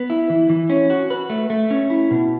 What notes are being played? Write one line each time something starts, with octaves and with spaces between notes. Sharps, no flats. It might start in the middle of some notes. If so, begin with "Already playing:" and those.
Already playing: B3
E4
E3
E3
C#4
F#4
B4
A3
A3
C#4
E4
B2